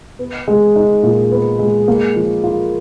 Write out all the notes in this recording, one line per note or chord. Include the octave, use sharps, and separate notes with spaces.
B3
G#3
D#4
A#2
B3
G#3
A#3
F3
F4